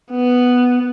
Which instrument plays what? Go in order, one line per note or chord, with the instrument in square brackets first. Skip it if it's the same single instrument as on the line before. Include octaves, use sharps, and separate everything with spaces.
[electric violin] B3